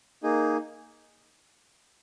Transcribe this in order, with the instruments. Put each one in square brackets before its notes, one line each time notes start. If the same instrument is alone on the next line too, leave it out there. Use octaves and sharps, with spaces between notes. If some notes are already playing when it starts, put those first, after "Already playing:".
[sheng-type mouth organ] A#3 D#4 G#4